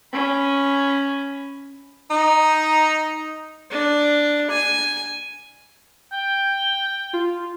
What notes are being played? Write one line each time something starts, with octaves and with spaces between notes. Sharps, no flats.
C#4 B5
D#4
D4
G#5
G5
F4